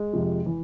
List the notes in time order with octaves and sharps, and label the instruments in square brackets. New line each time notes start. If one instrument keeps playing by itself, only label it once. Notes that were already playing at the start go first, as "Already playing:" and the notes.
Already playing: [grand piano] G#3
F2 C3 F3
E3